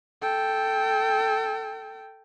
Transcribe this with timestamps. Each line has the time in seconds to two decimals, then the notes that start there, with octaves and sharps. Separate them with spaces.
0.22 A4 G5